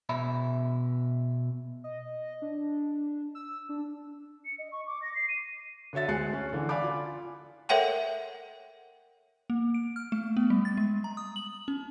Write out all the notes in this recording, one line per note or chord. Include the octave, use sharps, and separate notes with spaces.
B2 E5 B5
D#5
D4
E6
D4
C#7
D#5
C#6
D6
A#6
C7
D#7
D3 F#4 C#5 E5 A6
D2 G#3 G#5 F#6 C7 C#7
C#4
D3 E3
D5 F5 G#5 B5 D6
F4
A4 A#4 C#5 E5 F#5 G5
A#3
D7
F6
A3
B3
G3
A6
G#3
A#5
D#6
F#7
C#4